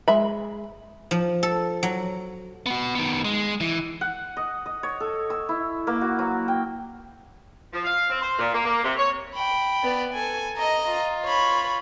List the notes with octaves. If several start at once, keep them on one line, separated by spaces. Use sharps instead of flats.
G#3 E5 B5
F3
A4
F#3
B3 F#4
D#3 B3
G#3
E3
F#5
D#5
D#5
C#5
A4
E6
E4
A#3
F#4
F#3
G5
F3
F5
C4
C5
A#2
A#3
A#3
C3
C#5
G5 B5
B3 D5
A4 G#5
D#5 A#5
F4
C#5 B5